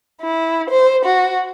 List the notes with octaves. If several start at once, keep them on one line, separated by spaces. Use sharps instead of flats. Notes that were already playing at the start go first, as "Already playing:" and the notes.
E4
C5
F#4